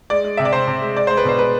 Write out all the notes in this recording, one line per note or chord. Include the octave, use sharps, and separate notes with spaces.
G#3 D5
G#3
C3 E5
D5
C3 C5
C3
G#3
G#3 D5
G#3 C5
B4
B2 C5
G#3 B4